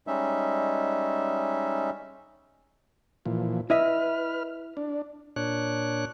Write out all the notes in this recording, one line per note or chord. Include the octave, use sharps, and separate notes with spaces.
G3 G#3 C#4 D#4 E5
A#2 E3 F3
E4 B4 D#5 E5 F6
D4
A#2 D4 C#5 F#6